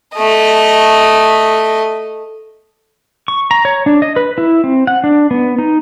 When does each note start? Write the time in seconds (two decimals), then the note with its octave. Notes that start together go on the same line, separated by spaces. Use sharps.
0.16 A3 D#5
3.28 C#6
3.51 A#5
3.65 C#5
3.86 D4
4.02 D#5
4.16 B4
4.38 E4
4.64 C4
4.87 F#5
5.04 D4
5.31 B3
5.59 D#4